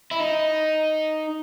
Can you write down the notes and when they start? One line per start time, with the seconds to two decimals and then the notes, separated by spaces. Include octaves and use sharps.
0.11 E4
0.20 D#4